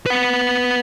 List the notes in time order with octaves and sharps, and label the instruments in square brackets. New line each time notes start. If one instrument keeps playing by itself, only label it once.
[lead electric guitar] B4 F#5